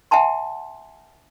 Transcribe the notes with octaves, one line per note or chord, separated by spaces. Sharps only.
E5 F#5 G#5 A5 C6